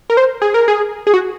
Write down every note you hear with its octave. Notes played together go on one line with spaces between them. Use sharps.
A#4
C5
G#4
A#4
G#4
G#4
F#4